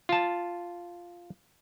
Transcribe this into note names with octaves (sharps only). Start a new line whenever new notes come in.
F4 A5